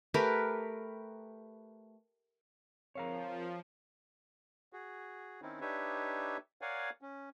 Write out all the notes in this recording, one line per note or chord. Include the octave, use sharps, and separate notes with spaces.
A3 G4 A#4 B4
F3 C4 G#4 A#4 C#5 F5 A#5
F#4 G#4
D#3 C4 C#4 D#4 E4
D4 D#4 G4 B4 C#5 E5
A#4 C#5 D5 F5 F#5 G#5
C#4